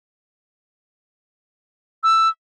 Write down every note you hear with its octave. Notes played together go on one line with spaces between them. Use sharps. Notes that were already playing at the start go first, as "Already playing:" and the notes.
E6